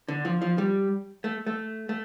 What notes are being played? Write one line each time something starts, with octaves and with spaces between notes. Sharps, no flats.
D3
F3
F3
G3
A3
A3
A3